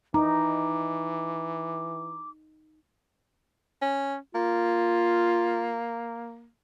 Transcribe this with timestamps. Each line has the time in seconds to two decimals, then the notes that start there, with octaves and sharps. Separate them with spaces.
0.14 E3 D#4 A#5 D6
3.82 C#4
4.35 A#3 F4